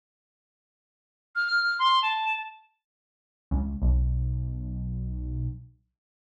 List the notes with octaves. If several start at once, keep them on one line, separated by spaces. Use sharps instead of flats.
F6
C6
A5
C#2
B1